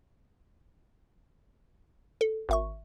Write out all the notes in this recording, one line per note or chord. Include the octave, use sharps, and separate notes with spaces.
A4
G#1 E5 C#6